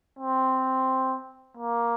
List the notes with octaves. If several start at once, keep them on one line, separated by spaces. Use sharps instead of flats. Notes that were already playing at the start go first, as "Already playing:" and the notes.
C4
A#3